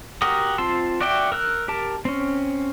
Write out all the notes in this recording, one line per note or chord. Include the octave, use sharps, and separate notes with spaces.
F#4 G4 A#4 F#5 D#6
C4 F4 A5 C6 E6
F#4 D5 E5 G5
A#4 E6 F#6
G4 A#4 A5
C4 C#4